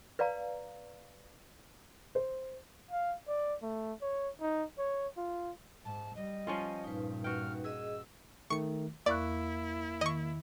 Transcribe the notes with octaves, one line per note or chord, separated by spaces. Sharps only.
B4 D5 F5 A#5
C5
F5
D5
A3
C#5
D#4
C#5
F4
G#2 A5
G3 D#5
F3 C#4 F4
G2 A#2 D#4 B4
F#4 G5 F6
G#4 D#5 E6
D#3 A3 C#6 C#7
E2 A#3 E4 D5 C#6 F#6
D#3 D#5 C#6